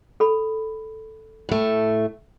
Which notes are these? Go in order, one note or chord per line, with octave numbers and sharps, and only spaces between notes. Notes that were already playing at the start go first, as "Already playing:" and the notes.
A4 B5
A2 A3